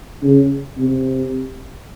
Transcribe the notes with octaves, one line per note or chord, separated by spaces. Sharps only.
C#3
C3